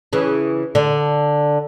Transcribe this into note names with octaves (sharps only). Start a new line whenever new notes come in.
C#3 E3
D3